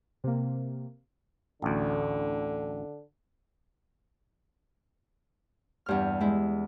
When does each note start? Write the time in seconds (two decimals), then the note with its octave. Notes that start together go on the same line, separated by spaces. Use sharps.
0.24 C3 A#3
1.62 A1 D2 D3
5.86 E2 G2 F6
6.21 G#3 E4